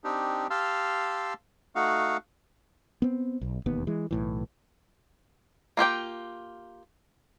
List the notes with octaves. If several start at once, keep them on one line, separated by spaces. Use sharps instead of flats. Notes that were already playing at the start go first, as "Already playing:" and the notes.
C4 D4 D#4 G4
G4 F5 A5 C6 E6 F6
A3 D#4 F#4 F5 F#5
B3 C4
B1
E1 D#2 B3
E3 G#3
B1 A2 E3
A#3 F4 G4 G5